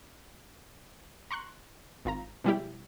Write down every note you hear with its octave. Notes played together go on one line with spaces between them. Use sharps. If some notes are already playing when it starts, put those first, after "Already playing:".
A#5 C6 C#6 F#6
G#1 F4 A#5
B2 F3 G3 G#3 E4 G4